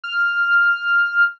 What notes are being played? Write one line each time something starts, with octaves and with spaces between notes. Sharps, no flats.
F6